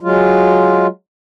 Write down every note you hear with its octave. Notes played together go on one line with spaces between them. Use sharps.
F#3 G#3 F4